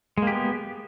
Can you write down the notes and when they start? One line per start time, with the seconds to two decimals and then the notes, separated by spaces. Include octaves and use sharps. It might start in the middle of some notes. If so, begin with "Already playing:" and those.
0.18 G#3
0.22 A#3
0.27 G4
0.32 B3